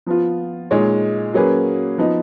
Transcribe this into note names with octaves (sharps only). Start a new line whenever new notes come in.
F3 B3 F4
A#2 G#3 D#4 G#4 C#5
F#3 A#3 C#4 G#4 B4
F3 B3 D#4